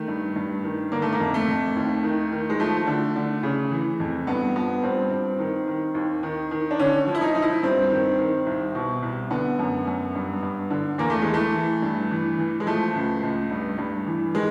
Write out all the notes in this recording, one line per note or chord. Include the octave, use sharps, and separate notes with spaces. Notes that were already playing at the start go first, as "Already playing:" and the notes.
Already playing: D#3 A3
G2
G2
D#3
D3 A#3
A3
A#3
F2
A3
F2
D#2
D#3
D#3
G#3
F3 A3
D3
D3
C#3
E3
F2
G2 B3
F3 B3
G2 C4
G2
D#3
D#3
D#2
D#3
D#3
D4
D3 C#4
F3
E4
D#4
F3 D#4
E4
G2 C4
D#3
D#3
C2
B2
C2
D3 B3
F#2
F#2
G2
G2
D3
E2 A#3
A3
E3 G#3
A3
E3
G2
E3
E3
G#3
F3 A3
C#2
C#2
G2
G2
E3
D#3 G#3